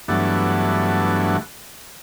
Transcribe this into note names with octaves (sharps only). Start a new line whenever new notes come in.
G2 E3 F#3 A3 B3 D4